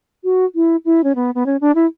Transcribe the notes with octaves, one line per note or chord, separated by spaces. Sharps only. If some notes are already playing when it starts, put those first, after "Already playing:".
F#4
E4
E4
C#4
B3
B3
C#4
D4
E4